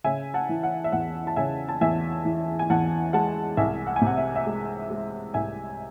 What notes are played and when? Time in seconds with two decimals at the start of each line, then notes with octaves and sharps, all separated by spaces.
0.04 C#3 E5 G#5
0.34 F#5 A5
0.49 E3
0.63 F#5
0.84 E5
0.92 E2 F#5
1.27 A5
1.36 C#3 E5 G#5
1.69 A5
1.81 E2 E5 G#5
2.25 E3
2.59 G#5
2.70 E2 F#5 A5
3.13 G#3 F#5 A5
3.57 C2 E5 G#5
3.87 F#5
3.96 G#5
4.01 C3
4.07 F#5
4.17 E5
4.36 E5
4.46 G#3
4.90 G#3
5.34 C2 E5 G#5